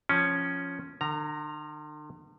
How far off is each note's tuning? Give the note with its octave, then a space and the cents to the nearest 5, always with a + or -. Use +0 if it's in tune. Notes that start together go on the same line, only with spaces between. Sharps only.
F3 +0 C#4 +0 G5 +0
D3 +45 A#5 +0